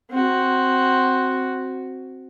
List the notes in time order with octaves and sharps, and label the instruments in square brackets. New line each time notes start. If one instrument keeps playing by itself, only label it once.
[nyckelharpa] C4 F#4